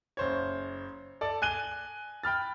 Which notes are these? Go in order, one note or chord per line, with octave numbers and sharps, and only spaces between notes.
F#1 C5 C#5
A4 D5
G#5 F#6 D#7 G7
G5 B5 F6 A6